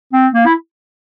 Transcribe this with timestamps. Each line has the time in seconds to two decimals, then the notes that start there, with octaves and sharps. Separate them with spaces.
0.13 C4
0.33 A#3
0.46 E4